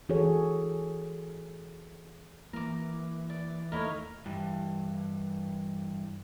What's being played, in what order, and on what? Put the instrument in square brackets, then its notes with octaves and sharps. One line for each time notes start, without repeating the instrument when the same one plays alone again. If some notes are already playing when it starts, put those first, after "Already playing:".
[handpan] E3 F#4 G#4 A4 C#5
[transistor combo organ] E3 [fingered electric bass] A#3 [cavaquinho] A#4 D6
[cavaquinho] D5
[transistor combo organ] D#2 A3 F6 [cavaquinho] D#4 E4 C#5
[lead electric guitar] G2 E3